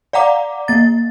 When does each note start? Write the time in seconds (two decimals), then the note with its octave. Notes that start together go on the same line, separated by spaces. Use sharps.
0.13 D5 F5 F#5 A#5 D6
0.68 A#3 A6